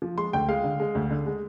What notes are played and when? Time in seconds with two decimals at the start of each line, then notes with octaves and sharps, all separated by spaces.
0.02 F3
0.18 G#3 C6
0.33 D2 G5
0.48 G#3 F5
0.64 D3
0.80 G#3
0.95 D2
1.10 D3
1.26 G#3